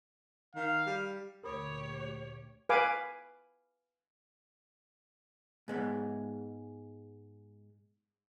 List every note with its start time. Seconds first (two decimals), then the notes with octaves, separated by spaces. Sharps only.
0.55 D#3 F5
0.86 G3
1.43 D2 A#2 G4 A#4 C#5 B5 D#6
2.69 B4 F5 G#5 D6
5.68 G#2 G#3 B3